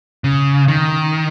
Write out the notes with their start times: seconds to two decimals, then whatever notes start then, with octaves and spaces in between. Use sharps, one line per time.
0.24 C#3
0.68 D#3